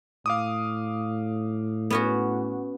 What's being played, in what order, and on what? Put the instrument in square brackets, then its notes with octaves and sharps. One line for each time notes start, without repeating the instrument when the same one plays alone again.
[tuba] A2 [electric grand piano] F5 D6 D#6
[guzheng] B3 C#4 F#4